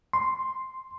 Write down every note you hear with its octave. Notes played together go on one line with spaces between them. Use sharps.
C6